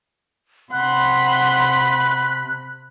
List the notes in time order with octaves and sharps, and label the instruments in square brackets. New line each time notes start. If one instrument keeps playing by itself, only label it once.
[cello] C3 [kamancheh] F#5 C6 [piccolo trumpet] B5 [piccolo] F#6